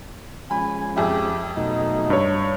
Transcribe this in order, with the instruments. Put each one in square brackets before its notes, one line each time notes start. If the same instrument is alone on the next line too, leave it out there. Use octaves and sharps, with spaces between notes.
[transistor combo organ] F3 G#3 C#4 [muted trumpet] G#5 [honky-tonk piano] B5
[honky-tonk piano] F2 G#4 E5 [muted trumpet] G4
[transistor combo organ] B2 F#3 A3 [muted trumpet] D#4
[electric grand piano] G2 C#5